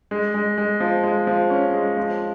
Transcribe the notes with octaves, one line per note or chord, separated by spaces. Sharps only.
G#3
G#3
G#3
F3
G#3
F3
C#4
G#3
F3